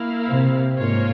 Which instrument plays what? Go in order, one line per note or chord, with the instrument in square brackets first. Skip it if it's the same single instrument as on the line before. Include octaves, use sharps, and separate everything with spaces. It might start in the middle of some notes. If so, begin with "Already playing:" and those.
Already playing: [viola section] A#3 E4 A#4 F5
[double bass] C3
[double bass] G#2 [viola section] A#3 F4 A#4 C#5 F5